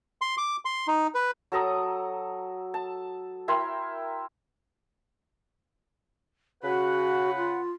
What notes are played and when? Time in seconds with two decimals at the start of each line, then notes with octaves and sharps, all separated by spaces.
0.21 C6
0.38 D6
0.65 C6
0.87 D#4
1.15 B4
1.52 F#3 A4 A#5 D#6
2.74 A5
3.48 E4 A#4 G5 C6
6.63 C#3 F#4 B4 F#5
7.37 F4